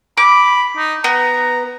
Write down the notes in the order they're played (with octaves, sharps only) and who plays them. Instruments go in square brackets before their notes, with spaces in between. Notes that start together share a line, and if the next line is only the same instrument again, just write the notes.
[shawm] B5 [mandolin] D6
[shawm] D#4
[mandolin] B3 [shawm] A#5